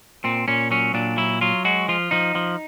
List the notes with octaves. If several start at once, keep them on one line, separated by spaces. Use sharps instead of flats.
A#2 C4
A#2 C#4
F#3 C#4
A#2 D4
F#3 E4
F#3 F4
G#3 F#4
F3 F4
F3 D#4
F3